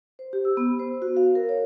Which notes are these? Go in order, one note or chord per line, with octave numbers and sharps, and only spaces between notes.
C5
G4
E6
B3
C5
F#4
F5
A#4
C#5